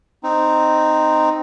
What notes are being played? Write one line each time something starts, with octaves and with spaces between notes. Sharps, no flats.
C4 D#4